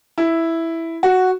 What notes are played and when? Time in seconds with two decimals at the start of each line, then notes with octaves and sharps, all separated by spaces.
0.18 E4
1.03 F#4